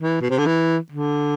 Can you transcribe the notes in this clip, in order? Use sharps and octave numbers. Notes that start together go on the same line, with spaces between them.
E3
B2
C3
D3
E3
D3